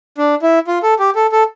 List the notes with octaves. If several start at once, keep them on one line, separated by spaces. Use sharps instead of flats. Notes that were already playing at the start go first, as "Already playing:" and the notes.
D4
E4
F4
A4
G4
A4
A4